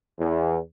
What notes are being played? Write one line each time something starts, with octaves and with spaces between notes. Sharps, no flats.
E2